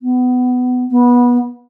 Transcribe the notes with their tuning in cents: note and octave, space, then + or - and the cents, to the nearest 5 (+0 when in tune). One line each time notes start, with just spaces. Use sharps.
B3 +20
B3 -20